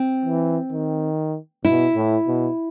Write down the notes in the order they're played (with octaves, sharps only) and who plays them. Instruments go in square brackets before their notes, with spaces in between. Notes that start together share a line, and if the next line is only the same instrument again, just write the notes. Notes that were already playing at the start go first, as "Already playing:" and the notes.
Already playing: [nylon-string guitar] C4
[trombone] E3
D#3
[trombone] B2 [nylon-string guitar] E4
[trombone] A2
B2